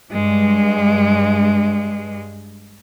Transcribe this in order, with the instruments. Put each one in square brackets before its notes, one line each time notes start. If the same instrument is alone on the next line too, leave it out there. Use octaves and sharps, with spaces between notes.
[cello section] G2 G#3